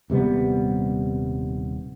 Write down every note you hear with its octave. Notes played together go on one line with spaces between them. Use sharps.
D#1 C3 G3 B3